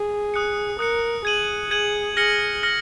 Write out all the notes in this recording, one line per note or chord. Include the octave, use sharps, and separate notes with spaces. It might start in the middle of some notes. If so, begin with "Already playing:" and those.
Already playing: G#4
D#6 F#6 C#7
A#4 D#6 F#6 C#7
G#4 G#6 D#7 F#7
G#4 G#6 D#7 F#7
G#4 F6 A#6 C#7 F#7
F6 A#6 C#7 F#7